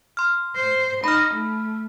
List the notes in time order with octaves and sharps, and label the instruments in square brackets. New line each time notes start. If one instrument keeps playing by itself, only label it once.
[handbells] C6 F6
[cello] C5
[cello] D#4 [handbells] B5 F6
[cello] A3